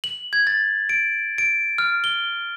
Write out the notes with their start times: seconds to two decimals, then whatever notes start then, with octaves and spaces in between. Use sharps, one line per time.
0.04 F#7
0.33 G#6
0.47 A6
0.89 D7
1.38 D7
1.78 F6
2.04 G7